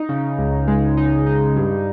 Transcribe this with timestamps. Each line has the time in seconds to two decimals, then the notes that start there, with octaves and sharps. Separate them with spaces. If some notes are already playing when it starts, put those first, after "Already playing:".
Already playing: D#4
0.09 C#3
0.38 C#2
0.68 G#3
0.97 D#4
1.26 D#4
1.56 G2